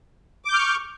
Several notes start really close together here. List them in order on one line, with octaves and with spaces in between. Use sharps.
D6 G6 F6 C#6